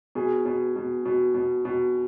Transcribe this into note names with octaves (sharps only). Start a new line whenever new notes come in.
B2 G#4
B2
B2
B2
B2
B2